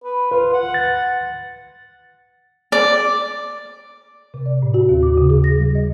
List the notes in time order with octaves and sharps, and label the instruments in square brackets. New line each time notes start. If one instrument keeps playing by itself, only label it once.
[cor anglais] B4
[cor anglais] F4 [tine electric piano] B4
[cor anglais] F#5
[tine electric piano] A6
[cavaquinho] D5
[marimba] C3
D5
A2
F#4
D#2
D6
C#3
G#4
A#6
G3
D#5